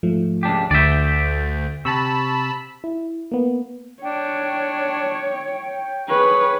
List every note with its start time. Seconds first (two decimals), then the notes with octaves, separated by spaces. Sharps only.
0.03 G#2 F3 A3
0.43 C#2 D4 G4
0.71 D2 D3 D5 E5 G6
1.85 C3 A5 B5 C#6 E6
2.84 E4
3.31 A#3 B3
4.03 D4 C#5 G5
6.09 G#4 B4 C#5